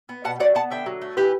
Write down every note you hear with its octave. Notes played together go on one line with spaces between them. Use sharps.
B3
B2 F#5 A5
F#3 D5 F#5
B3 F#5 A5
D3 E5 G5
F#3
A3
E3 G4 B4